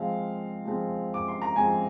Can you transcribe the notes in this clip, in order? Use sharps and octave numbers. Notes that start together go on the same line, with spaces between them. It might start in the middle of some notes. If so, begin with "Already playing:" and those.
Already playing: F3 G#3 C4 F5
F3 G#3 C4
D6
C6
A#5
F3 G#3 C4 G#5